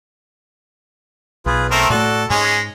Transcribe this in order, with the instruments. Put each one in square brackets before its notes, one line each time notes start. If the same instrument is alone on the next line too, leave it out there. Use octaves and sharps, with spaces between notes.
[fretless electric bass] B1 [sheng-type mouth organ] F4 G#4 B4
[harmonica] A3 C4 A#4 [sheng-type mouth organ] D6
[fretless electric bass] A2 A3 [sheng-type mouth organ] F#4 D5 [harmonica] A4
[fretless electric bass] G#2 [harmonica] G#3 C#4 [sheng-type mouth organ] G#5